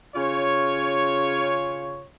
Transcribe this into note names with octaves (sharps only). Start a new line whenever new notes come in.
C#3 F4 C#5